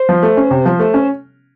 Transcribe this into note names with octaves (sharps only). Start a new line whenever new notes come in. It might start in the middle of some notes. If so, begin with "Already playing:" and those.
Already playing: C5
F3
A3
C#4
C3
F3
A3
C#4